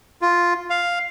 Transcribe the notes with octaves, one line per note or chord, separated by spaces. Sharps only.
F4
F5